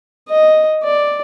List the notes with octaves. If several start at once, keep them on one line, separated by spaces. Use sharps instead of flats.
D#5
D5